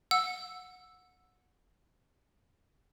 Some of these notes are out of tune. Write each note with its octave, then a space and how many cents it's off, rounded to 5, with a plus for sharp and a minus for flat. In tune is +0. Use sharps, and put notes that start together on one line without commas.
F#5 -20 E6 +0